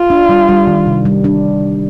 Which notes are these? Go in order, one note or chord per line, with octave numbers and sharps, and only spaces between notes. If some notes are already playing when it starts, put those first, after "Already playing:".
Already playing: F4
D4
G3
G3
D#3
C3
G3
D4